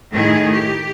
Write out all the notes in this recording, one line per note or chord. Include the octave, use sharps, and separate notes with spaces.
A2 D#3 G#4
G4